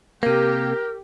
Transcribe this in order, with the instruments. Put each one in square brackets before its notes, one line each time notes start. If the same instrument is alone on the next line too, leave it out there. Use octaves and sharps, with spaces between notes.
[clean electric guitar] C3 A#3 [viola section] G4 [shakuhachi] A#4